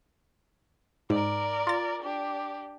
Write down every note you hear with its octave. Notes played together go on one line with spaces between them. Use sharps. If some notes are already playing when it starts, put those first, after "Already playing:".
G#2 A#4 D5
F4 A6
D4 G4